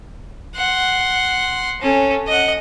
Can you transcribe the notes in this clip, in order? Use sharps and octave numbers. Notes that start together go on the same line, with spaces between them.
F#5 C6
C#4 A4
D#5 F#5